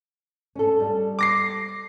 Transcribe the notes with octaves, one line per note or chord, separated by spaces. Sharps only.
C#4 A4
G3
D6 A#6 C7